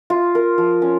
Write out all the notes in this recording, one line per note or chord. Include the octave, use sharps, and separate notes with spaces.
F4
A#4
F3
C#4